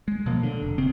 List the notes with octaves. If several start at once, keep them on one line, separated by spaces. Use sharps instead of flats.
G#3
B2 F3 F#3 A#3
D3
F1
C#3 C4